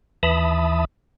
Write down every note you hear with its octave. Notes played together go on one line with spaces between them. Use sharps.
D#2 E3 E5 A5 B5 D#6